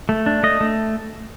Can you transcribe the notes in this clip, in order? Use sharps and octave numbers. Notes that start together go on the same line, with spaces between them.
A3
D4
A3 D#5
A3